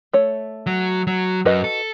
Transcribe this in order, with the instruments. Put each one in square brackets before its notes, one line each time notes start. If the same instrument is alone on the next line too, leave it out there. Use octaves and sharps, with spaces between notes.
[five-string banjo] A3 C#5
[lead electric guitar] F#3
F#3
[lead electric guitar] F#2 [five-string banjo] F#4 B4 D#5
[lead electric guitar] A4